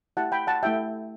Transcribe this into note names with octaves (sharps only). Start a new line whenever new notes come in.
A3 E4 G4 F#5 A5
G5 B5
F#5 A5
A3 E4 G4 E5 G5